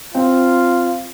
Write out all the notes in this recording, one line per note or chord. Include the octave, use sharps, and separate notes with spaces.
C4 F4